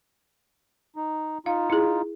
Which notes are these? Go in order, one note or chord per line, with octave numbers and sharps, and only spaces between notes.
D#4
D#4 F4 F5
E4 G#4